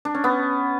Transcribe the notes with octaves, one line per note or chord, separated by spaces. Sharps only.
D4
C#4
B3